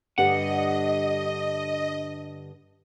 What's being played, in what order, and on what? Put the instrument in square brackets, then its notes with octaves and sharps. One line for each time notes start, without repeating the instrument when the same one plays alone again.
[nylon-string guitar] G2 D3 G4 [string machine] D#5 [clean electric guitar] F#5